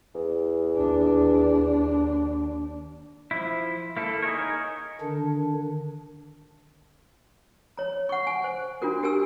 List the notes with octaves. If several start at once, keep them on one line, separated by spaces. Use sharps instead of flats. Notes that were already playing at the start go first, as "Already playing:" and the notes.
E2
D#2 D4
F3 E4
A#3 E4 A4
D#4 G#4 A#4 C#5
D3 D#3 D4
C#5 A#5
F#5 C#6
G#5
C5
D4 F4 F#4 A#4
G4 A#4 G#5 E6